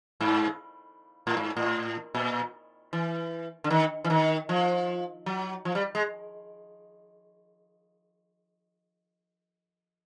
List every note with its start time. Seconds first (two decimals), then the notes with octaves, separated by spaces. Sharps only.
0.21 G#2
1.27 A2
1.37 G#2
1.57 A2
2.15 A#2
2.93 E3
3.64 D3
3.70 D#3
4.04 E3
4.10 D#3
4.49 F3
5.26 F#3
5.65 F3
5.75 G3
5.95 G#3